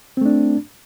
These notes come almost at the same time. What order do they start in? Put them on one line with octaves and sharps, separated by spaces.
C4 A3 D4